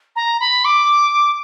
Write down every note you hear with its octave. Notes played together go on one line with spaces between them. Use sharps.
A#5
B5
D6